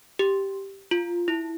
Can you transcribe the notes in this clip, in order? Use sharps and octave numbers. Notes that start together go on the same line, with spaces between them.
G4
F4
E4